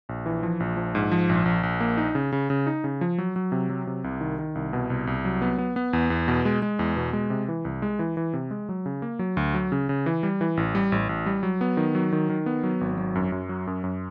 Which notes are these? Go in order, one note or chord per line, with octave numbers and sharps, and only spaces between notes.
A#1
E3
F3
A#1
F3
G#2
F3
A#1
A#1
A#1
A#3
D#4
C#3
C#3
C#3
D#4
C#3
F3
F#3
F#3
C3
F#3
C3
C2
D#3
D#3
C2
B2
C2
C2
F#3
B3
B3
B3
E2
E2
B2
G#3
G#3
E2
B2
G#3
C3
E3
C2
G#3
E3
E3
C3
G#3
F#3
C#3
A#3
F#3
D2
F#3
C#3
C#3
E3
G3
E3
A1
G3
A1
A1
G3
F#3
B3
D#3
F#3
D#3
D#3
B3
F#3
G#1
F#3
F#2
F#2
F#3
F#2
F#2